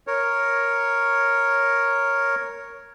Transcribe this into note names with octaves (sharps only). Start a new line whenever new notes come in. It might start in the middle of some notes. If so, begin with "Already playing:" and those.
A#4 C#5